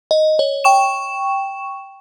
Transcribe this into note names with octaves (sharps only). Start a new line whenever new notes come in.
D#5
C#5
G5 C#6 E7